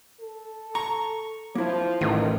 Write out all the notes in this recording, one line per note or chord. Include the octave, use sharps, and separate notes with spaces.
A4
A#5 C#6
F3 A#3 E4
A1 D#3